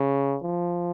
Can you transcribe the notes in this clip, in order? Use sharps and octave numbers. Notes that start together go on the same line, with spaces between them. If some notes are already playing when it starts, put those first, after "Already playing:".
Already playing: C#3
F3